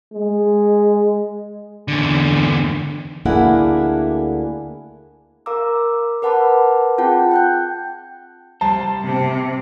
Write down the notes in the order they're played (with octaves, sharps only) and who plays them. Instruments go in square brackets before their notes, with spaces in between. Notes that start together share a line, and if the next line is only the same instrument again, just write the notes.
[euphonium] G#3
[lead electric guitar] E2 D3
[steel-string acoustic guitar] D2 A#3 D4 E4 G#4 F#5
[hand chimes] A#4 F5 A#5 D6 E6
A#4 B4 F#5 A5 B5 D6
C4 F4 G#4 F#5 G5 A5
G5 F#6 G6
[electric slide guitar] G3 C5 [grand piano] A5
[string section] C3